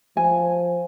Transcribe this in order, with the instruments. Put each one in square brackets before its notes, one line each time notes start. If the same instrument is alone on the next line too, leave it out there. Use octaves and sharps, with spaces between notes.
[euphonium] F3 [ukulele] G#5